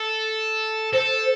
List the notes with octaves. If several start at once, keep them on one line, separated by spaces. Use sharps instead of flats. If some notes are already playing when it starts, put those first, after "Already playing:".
Already playing: A4
A4 C5